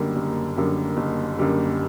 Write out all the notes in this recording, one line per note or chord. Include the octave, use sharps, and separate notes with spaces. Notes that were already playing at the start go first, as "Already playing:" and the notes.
Already playing: F#1 F#2 D3 G3 A#3
F#1
F#2 D3 G3 A#3
F#1
F#2 D3 G3 A#3